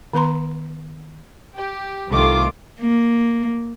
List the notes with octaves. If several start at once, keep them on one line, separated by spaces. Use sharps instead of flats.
D#3 B3 B4 A#5 C6
G4
C2 D#3 A3 F4 D6
A#3